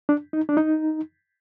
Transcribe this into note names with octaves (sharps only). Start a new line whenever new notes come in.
D4
D#4
D4
D#4